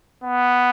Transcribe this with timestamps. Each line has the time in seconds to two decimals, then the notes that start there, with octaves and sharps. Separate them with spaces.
0.24 B3